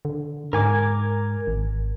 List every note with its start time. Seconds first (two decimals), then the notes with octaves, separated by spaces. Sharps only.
0.05 D3
0.53 G#2 A#4 G#5 D6
1.47 G#1